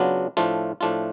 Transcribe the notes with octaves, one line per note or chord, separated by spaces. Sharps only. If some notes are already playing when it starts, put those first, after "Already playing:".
Already playing: C#3 F#3 B3 D4 F4
A2 F3 A3 D4 F4
A2 F3 A3 D4 F4